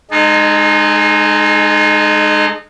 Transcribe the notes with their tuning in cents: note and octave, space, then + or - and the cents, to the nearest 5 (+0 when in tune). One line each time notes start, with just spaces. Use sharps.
G#3 +0 D#4 -25 A4 -45